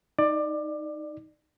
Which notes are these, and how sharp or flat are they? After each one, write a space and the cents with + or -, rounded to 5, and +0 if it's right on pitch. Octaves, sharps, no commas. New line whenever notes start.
D#4 +0 D5 +20